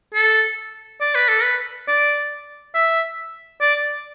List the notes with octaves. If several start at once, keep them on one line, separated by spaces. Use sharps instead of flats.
A4
D5
B4
A4
B4
D5
E5
D5